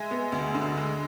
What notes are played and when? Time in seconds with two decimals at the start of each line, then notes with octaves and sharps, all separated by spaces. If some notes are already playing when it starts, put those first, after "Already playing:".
Already playing: G#3 E5 G#5
0.11 B3
0.32 D2
0.55 D3
0.77 G#3